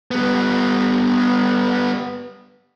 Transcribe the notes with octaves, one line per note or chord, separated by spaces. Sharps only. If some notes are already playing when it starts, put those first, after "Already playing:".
G3 B3